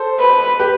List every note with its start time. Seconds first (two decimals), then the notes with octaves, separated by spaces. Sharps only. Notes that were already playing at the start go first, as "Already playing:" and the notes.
Already playing: A4 C5
0.20 B4
0.60 G4 B4